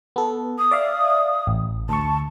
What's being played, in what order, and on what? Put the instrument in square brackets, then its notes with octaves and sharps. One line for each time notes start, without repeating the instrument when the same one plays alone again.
[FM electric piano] B3 A4
[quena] D#6
[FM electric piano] D5 E5 F5
A1
[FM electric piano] D2 C#6 [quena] A5